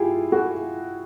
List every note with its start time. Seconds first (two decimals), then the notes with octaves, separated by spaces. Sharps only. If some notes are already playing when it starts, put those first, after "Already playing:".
Already playing: E4 F4 G4 G#4
0.32 F#4 G#4